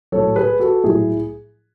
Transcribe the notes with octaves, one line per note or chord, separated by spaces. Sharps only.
A2 F#3 A4 C#5
G#4 B4
F#4 A4
A2 F#3 E4 G#4